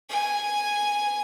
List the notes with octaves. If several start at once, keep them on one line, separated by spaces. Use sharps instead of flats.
G#5